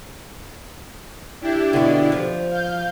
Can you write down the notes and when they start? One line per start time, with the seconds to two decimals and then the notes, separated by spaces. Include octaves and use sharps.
1.41 D4 E4 G4
1.73 B2 D3
2.12 F3
2.51 F5 G6